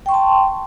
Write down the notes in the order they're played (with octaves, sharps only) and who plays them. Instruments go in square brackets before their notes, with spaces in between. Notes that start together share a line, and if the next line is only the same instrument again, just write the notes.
[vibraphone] G5
C#6
C6
A5